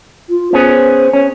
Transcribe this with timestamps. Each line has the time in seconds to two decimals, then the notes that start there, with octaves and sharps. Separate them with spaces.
0.29 F4
0.53 B3 C#4 G#4 C5
1.13 C#4 C#5